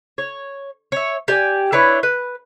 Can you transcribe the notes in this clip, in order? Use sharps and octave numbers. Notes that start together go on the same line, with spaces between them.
C#5
C#5 E5
G4 D5 G#5
D4 E4 B4 C#5
B4